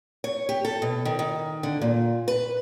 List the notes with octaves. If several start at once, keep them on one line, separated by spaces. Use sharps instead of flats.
C#5
G4
A4
B2
D#3
D#3
D3
A#2
B4